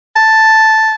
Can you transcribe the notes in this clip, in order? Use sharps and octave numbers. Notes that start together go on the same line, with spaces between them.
A5